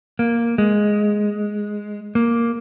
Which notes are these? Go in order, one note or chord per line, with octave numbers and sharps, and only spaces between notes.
A#3
G#3
A#3